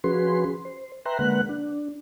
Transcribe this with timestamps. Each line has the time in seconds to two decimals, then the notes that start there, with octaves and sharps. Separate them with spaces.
0.04 F3 C#4 F#4 G#4 B4 C6
0.65 C5
1.05 B4 E5 G5 A#5 C6 F#6
1.19 D3 G#3 A#3 B4 F#5 F#6
1.49 D4